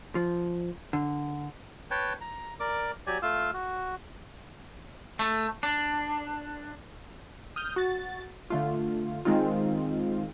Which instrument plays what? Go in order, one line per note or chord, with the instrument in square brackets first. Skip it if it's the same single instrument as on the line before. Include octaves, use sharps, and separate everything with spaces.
[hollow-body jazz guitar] F3
D3
[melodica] B4 C#5 G5 A5
A#5
A#4 D5 D6
F#3 G4 D5 G#5
A3 F4 F5 E6
F#4
[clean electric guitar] A3
D4
[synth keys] D#6 F6 G6
F#4 A6
D3 A3 F4
D#3 G#3 C4 D#4 F4